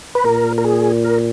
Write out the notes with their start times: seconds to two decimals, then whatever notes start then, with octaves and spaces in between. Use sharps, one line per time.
0.15 B4
0.25 A#2 A#4
0.58 A#4
0.64 G#4
1.04 A#4